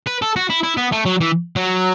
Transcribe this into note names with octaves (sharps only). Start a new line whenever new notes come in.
B4
A4
F#4
E4
E4
B3
A3
F#3
E3
F#3